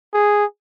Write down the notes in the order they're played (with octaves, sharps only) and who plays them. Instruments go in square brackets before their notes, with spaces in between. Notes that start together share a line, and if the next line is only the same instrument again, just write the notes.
[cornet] G#4